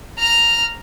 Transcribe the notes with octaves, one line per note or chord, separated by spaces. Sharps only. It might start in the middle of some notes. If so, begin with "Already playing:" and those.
A#5 F6